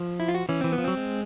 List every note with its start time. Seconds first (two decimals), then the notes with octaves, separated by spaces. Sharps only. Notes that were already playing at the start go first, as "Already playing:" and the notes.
Already playing: F3
0.20 E4
0.29 F4
0.34 F#4
0.49 E3 C#4
0.61 E3 C4
0.72 B3
0.78 F3
0.85 F#3 C4
0.97 G#3